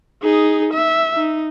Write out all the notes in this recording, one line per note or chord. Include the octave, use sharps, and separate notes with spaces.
D#4 G#4
E5
D#4